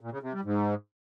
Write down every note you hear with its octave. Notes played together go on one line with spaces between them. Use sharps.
A#2
C#3
C3
G3
G#2